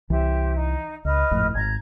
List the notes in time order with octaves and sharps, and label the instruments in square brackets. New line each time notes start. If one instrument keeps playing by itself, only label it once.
[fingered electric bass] C2 E3 [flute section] G4 C5 E5
[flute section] D#4
[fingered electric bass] C#2 [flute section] B4 D#5 F6
[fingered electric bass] G#1 F2 A2
[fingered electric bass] G#1 [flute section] A#5 G#6